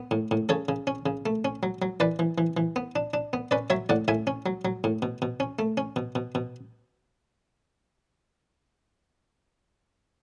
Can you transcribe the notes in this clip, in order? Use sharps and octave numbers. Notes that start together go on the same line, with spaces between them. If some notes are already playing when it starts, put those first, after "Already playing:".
Already playing: B3
A2
A2
C#3 A4 C#5
C#3
C#4
C#3
A3
C#4
F#3
F#3
E3 B4 D5
E3
E3
E3
B3
D4
D4
B3
C#4 B4 D5
F#3 C#5 E5
A2 D5 F#5
A2 E5 G#5
C#4
F#3
F#3
A2
B2
B2
C#4
A3
C#4
B2
B2
B2